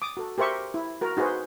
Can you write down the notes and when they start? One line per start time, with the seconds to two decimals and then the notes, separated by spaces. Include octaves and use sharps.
0.02 D6 D#6
0.17 F#4 A4
0.38 G4 A#4 C5 E5 C#6
0.74 E4
1.01 F#4 A#4
1.17 D#4 F#4 G#4 B4 C5